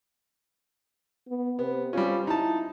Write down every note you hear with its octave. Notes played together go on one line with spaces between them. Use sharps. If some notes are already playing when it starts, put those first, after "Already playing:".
B3
C3 B3
G3 C4 C#4 F4
D#4 E4 A5